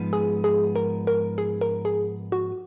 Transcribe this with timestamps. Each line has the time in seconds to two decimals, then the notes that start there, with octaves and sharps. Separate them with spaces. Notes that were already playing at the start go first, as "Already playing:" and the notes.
Already playing: G#2 F3 G#3 B3 D#4
0.13 G#4
0.44 G#4
0.76 A#4
1.07 A#4
1.38 G#4
1.61 A#4
1.85 G#4
2.32 F#4